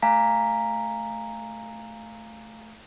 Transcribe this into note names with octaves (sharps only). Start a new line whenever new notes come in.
A3 F5 G#5 A#5 B6